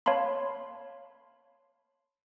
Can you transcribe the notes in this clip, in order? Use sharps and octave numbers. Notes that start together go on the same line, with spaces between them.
C#5 F5 A5 B5 C6